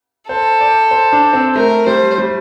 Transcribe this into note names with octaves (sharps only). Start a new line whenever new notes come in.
A4 C5
D5
C5
D4
C4
A3 A#4
G3 C5
G3